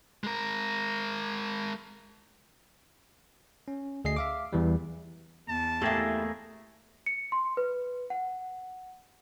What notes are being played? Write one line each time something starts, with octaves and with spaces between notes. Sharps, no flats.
G#3 A#4
C#4
D2 G#4 D#5 C7
E5 F5 D6
E2 E3 G3
E2 A5
A3 A#3 E4 G4 G#4
C#7
C6
B4
F#5